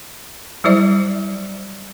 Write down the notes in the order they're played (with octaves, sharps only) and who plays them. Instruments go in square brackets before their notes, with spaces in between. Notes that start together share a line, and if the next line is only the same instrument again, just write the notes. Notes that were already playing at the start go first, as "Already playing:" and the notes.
[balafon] F#3 G3 E4 C5 D5